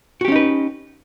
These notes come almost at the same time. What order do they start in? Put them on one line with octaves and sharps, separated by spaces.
F#4 G4 C#4 D#4 B4